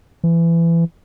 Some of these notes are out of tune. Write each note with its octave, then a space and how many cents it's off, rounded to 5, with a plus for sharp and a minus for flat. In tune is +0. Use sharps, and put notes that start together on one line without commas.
E3 +25